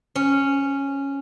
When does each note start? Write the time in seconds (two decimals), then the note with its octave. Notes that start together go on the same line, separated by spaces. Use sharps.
0.15 C#4